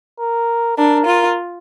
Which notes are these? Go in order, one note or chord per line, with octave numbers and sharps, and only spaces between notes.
A#4
D4 A#4
F4